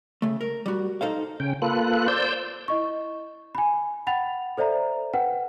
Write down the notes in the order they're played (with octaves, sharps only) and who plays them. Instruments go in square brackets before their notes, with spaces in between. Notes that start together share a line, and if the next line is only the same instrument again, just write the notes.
[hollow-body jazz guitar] C#3 A3
A#4
G3 F#4
D#4 A4 C5 F5
[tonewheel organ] C#3 C#4 G5
A#3 F4 A4 B4 F#6
C5 D5 E6 G6
[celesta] E4 D#5 C#6
G#5 B5
F#5 G5 B5 A6 F7
A4 C5 D5 E5 A#5
B4 F#5 G5